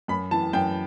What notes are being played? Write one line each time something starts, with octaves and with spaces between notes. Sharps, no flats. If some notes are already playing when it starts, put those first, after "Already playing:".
F#2 B5
E3 A5
F#2 G5